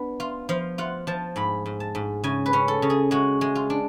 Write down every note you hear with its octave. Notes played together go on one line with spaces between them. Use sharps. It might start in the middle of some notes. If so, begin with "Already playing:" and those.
Already playing: B3 D4
F4
F3 F5
F4 F#5
F3 A5
G#2 B5
G#2
A5
G#2
C#3 G#5
B4
C#4
A4
C#3
G#4
G#3 F#4
G#3
F4
D4